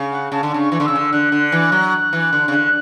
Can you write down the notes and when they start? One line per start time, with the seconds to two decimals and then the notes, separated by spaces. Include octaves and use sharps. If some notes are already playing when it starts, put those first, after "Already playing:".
Already playing: C#3
0.12 F#5
0.32 C#3 A5
0.43 D3
0.54 C#3 C#6
0.72 E3
0.80 D3
0.85 C#3 E6
0.96 D3
1.12 D3 F#6
1.32 D3
1.52 E3
1.72 F#3
2.13 E3
2.33 D3
2.48 C#3
2.52 D3